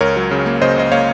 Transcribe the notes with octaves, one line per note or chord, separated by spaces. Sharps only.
C#2 A#4 C#5
F#3
C#3
A#3
C#3 C5 D#5
C#2 D#5
A#3 C#5 F5